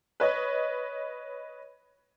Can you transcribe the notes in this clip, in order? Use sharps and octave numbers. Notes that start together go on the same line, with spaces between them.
B4 C#5 D#5